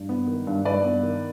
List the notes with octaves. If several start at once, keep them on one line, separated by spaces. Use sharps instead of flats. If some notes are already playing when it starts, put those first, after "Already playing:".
Already playing: G2
B3
D#3
G2
G2 B4 D5
B3
D#3